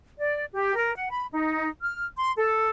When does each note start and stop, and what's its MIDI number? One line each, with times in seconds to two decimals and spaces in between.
0.18 0.44 74
0.53 0.76 67
0.76 0.92 70
0.95 1.10 78
1.11 1.24 83
1.31 1.68 63
1.82 2.06 89
2.17 2.31 84
2.37 2.69 69